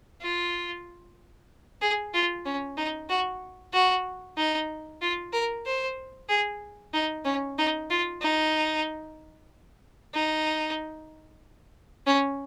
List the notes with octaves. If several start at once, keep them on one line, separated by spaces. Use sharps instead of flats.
F4
G#4
F4
C#4
D#4
F#4
F#4
D#4
F4
A#4
C5
G#4
D#4
C#4
D#4
F4
D#4
D#4
C#4